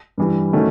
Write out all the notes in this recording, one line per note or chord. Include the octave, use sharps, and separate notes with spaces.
G2 E3 G3
D#3 F#3 A3 C#4